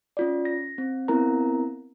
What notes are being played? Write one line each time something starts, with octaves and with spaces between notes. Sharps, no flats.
C#4 F4 D5
A#6
C4
B3 C4 E4 A#4 A#5